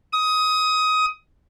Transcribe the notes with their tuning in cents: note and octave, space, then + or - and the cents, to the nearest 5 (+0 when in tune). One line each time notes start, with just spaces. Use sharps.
D#6 +20